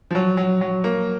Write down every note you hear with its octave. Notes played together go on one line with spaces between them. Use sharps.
F3
F#3
F#3
F#3
A#3